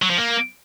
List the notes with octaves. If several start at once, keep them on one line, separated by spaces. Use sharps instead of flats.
F#3
F3
A#3